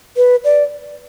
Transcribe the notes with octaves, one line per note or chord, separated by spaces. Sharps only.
B4
D5